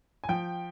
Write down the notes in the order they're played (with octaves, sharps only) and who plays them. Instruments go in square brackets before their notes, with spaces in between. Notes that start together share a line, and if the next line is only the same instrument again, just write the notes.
[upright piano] G#5
F3 G5